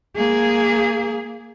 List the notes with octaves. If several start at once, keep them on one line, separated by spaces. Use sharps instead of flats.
A#3 G#4